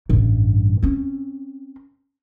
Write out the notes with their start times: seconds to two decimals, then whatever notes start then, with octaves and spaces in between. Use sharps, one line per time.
0.09 A1 G2
0.83 C4 C#4